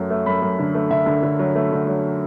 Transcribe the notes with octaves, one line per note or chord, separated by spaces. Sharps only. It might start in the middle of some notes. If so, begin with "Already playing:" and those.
Already playing: F#2 F#3 A3
A3
F#2 B5
F#2
D3
A3
D3 E5
D3
D3
F#3
A3
D3
F#3